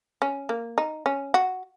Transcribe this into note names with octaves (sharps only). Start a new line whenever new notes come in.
C#4
A#3
D#4
C#4
F#4